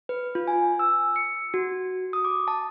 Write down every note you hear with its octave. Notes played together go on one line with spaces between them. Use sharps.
B4
F4
G#5
E6
C#7
F#4
D#6
D6
A5